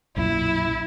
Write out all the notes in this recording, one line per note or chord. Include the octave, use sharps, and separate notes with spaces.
B1 F#2 A#2 E4